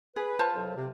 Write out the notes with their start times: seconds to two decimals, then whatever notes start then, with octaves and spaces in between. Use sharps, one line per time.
0.16 G#4 B4
0.39 F4 C5 A5
0.55 C2 F2 F#3
0.76 C3